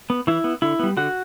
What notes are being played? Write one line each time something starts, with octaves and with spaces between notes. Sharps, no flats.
B3
E3 E4
B3
D3 E4
G3 B3
D3 F#4